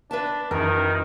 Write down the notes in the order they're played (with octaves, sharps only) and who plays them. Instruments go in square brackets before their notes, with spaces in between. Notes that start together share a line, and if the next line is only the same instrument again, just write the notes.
[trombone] D4 [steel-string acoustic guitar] B4 E5 A5
[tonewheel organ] F#2 E3 D#4 [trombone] D#3 [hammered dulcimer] A#4